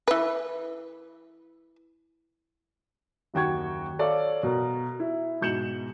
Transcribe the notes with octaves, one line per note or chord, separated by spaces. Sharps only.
E3 B4
F#1 D#2 F#4 G5 C#6 G#6
A4 C#5 D5 F5
B2 A#4
E4
G#2 B2 G6 C#7 E7 F#7